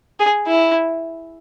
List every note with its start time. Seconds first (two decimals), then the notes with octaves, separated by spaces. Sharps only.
0.19 G#4
0.47 E4